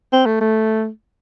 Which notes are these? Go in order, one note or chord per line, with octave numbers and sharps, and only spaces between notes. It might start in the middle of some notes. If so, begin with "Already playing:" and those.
C4
A3
A3